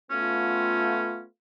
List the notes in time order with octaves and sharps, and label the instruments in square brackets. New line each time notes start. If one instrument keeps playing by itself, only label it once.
[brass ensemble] A3 B3 F4 [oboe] C#4